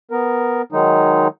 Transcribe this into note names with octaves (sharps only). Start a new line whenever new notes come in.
B3 A#4
D#3 F#3 G#3 D#4